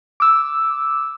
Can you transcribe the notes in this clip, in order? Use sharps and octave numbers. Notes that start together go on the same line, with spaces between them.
D6 E6